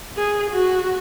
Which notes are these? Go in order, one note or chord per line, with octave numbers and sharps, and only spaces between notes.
G#4
F#4